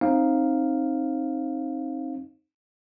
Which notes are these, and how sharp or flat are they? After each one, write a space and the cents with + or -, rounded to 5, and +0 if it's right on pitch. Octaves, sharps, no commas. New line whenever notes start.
C4 +30 D#4 +0 F5 +0